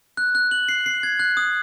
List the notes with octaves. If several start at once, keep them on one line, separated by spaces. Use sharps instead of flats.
F#6
F#6
F#7
C7
C7
G#6
F#6
D#6